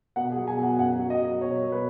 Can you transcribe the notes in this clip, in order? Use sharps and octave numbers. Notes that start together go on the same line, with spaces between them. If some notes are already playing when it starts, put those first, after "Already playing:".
B2 F#5
G#4
F#3
G#5
F#3
F#5
F#2 F#5
F#3
D#5
F#3
B2 C#5
F#3
B4